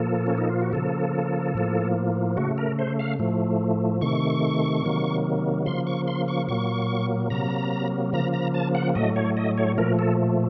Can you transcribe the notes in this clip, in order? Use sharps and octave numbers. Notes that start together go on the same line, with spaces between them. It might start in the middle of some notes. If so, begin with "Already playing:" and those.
Already playing: A#2 F3 A#3 A4
C#4
D#4
F4
F#4
C#3 F3 A#3 A4
A2 F3 A#3
C#3 A3 F#4
A#4
C5
F5
A2 F3 A3
C3 D#3 A3 C#6
C3 D#3 F#3 A#3
C#3 F3 A#3 C6
C#6
C6
C#6
A#2 F#3 A#3 C#6
C3 F#3 A#3 A#5
C#3 F3 A#3 A#5
A#5
A5
F#5
A2 F#3 A3 D#5
C#5
D#5
C#5
A#2 F3 A3 A#4
A4